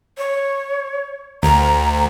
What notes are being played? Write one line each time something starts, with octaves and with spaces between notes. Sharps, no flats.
C#5
D2 A#5